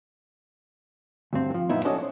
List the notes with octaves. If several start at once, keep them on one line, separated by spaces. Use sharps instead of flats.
D2 G2 C4
E3 F3
F#2 A#2 B3 D#4 E4
C#4 D4 F#4 A4 C#5 D#5
C5 C#5